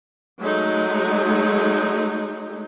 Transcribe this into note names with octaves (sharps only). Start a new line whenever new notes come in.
F#3 G#3 A3 D#4